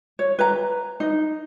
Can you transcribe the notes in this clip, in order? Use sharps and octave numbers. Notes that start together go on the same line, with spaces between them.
C#5
B4 A#5
D#4